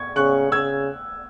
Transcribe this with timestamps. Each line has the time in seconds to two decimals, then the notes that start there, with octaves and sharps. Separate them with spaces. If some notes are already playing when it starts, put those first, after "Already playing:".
Already playing: C#6 G#6
0.16 C#3 C#6 F#6
0.51 C#3 E6 G#6